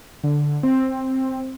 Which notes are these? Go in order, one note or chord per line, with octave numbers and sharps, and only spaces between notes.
D3
C4